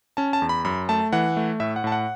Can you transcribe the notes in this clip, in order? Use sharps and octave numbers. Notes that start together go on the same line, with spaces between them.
C#4 A5
A5
E2
B5
F#2 B5
A3 A5
E3 F#5
A3
A2 E5
F#5
A2 A5
F#5